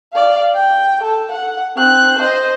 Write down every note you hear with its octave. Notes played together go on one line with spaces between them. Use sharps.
D5 F5
G5
A4
F#5
C4 F#6
C5 D#5